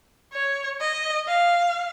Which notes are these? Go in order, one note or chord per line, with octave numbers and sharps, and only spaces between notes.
C#5
D#5
F5